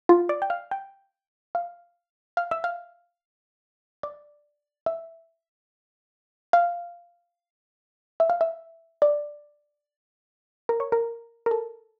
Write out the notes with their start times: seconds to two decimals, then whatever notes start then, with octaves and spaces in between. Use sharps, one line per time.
0.09 F4
0.29 D5
0.42 G5
0.50 F5
0.71 G5
1.55 F5
2.37 F5
2.51 E5
2.64 F5
4.03 D5
4.86 E5
6.53 F5
8.20 E5
8.30 F5
8.41 E5
9.02 D5
10.69 A#4
10.80 C#5
10.92 A#4
11.46 A#4
11.51 A4